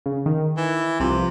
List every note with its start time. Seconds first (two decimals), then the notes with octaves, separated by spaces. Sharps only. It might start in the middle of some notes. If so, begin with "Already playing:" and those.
0.06 C#3
0.26 D#3
0.57 E3
1.00 C2 C3 F3